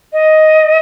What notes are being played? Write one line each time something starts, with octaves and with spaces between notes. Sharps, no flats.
D#5